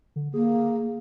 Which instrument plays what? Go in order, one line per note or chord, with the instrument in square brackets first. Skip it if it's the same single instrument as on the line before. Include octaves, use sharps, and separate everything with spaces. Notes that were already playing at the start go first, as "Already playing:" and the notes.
[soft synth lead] D3
[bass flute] A#3 [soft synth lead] G#4